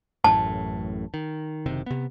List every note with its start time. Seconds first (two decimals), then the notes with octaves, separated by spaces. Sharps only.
0.24 A1 F#2 A2 A5
1.14 D#3
1.66 F#1 C3 D#3
1.86 C3 B3